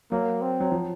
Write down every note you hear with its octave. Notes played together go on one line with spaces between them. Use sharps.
F#3 A#3
C4
F#3
F3